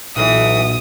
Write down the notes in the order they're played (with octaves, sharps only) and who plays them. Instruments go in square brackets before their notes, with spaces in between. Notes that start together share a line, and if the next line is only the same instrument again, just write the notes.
[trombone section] B1 [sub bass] A#2 [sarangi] E3 [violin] D#6